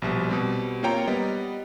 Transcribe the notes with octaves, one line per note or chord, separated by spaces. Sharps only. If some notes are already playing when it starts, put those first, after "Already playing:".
A#1 B2 G3
B2 G3 C4
A#3 C4 F4 C#5 G5 A#5
G3 B3 D#5